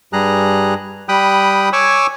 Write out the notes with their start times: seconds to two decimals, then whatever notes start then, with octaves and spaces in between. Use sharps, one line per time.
0.13 G2 G3 G#4 A#5 F#6
1.09 G3 G5 B5 D#6 F#6
1.73 C#5 G#5 C#6 D6 E6